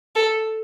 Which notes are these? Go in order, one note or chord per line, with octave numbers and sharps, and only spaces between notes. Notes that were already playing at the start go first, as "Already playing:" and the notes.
A4